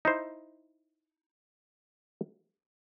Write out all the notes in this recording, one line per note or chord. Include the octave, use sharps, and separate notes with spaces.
D#4 E4 C5